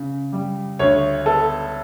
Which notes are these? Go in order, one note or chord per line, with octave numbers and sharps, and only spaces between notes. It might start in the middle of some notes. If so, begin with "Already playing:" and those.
Already playing: C#3
G3
D2 C#5
B3 A4